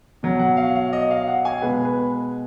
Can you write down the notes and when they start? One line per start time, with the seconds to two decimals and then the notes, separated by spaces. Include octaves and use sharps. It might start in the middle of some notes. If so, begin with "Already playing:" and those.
0.23 B2 F#3
0.39 F#5
0.57 F5
0.75 F5
0.93 D#5
1.11 F5
1.28 F#5
1.45 G#5
1.62 B2 G#3 B4
1.85 B4